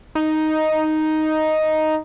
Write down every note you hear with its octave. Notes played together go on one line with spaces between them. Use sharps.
D#4